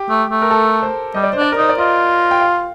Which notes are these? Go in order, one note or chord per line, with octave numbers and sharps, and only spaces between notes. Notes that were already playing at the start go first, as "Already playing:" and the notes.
Already playing: G4
A3
A3
A#4
A4
C5
G3 D#5
D5
D4 C5
D5
A#4
D#4 C5
D5
F4 D#5
G5
F5